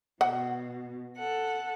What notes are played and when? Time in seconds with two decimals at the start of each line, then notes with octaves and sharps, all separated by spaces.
0.21 B2 F#5
1.16 A4 F#5